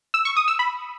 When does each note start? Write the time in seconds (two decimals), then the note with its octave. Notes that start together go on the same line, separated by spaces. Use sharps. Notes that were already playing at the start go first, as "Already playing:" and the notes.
0.14 E6
0.25 C#6
0.37 D#6
0.48 E6
0.59 B5